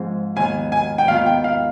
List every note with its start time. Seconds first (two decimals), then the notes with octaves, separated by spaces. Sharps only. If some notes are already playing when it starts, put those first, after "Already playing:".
Already playing: G#2 F3 C4
0.36 D#2 D#3 B3 G#5
0.72 G#5
0.98 G5
1.08 D#3 B3 F4 F5
1.26 G5
1.44 F5